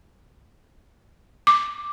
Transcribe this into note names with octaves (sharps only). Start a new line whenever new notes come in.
D6